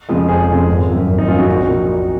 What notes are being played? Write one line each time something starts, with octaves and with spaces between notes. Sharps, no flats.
F2 C#3 F3 G#3
F1 G#4 C5
F2 C#3 F3 G#3
G#1
F#2 F3 C4
G#1
D#4
F#2 F3 C4 C#4 F4
D#4 F#4
A#1
A#2 F3
A#1